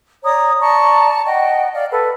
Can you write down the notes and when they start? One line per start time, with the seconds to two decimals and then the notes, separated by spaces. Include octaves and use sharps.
0.24 C#5 D5 A#5 D#6
0.60 D5 A5 A#5 C#6
1.25 D#5 F#5 G5
1.74 D5 F5
1.92 A4 B4